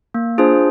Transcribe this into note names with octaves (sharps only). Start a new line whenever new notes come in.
A#3
D4 F4 G#4 C5